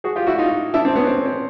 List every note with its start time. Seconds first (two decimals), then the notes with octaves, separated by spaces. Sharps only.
0.04 F#4 G#4
0.16 F4 G4
0.27 E4 F#4
0.38 D#4 F4
0.74 D4 E4
0.85 C4 D4
0.96 B3 C#4
1.07 C4
1.17 C#4
1.26 C4